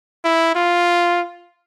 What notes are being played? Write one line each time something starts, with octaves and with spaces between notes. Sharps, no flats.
E4
F4